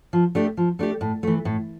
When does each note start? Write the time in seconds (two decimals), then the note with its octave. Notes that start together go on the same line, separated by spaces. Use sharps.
0.13 F3
0.35 A3 D4 G4
0.57 F3
0.79 A3 D4 G4
1.01 A2
1.23 E3 A3
1.45 A2